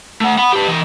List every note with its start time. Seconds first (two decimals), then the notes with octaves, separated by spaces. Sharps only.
0.21 A3 F#5
0.38 F#5 B5
0.53 G4 B4
0.68 E3 D#5